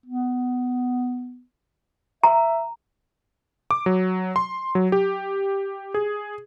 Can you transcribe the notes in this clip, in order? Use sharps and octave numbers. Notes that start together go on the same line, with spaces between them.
B3
E5 A#5
D6
F#3
C6
F#3
G4
G#4